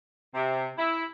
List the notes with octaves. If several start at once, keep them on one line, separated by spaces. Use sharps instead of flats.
C3
E4